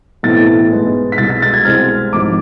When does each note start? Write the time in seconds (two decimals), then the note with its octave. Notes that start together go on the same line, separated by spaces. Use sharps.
0.23 B1 A2 E3 A3 C4 A6
0.70 G#2 G#3 B3
1.12 B6
1.18 C2 B2 G#3 A6
1.30 A6
1.42 A6
1.53 G#6
1.65 C2 C3 G#3 C4 F6
2.13 G#1 G#2 F3 D6